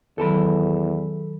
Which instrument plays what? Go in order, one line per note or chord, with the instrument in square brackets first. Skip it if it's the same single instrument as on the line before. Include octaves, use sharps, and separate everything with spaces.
[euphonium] E2 [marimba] D#3 F#3 [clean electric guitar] A4 A5 B5